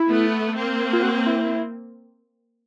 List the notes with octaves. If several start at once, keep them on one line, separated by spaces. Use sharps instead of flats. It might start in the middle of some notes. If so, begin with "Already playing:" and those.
Already playing: E4
A3 B3
A#3 C4
F4
F#4
E4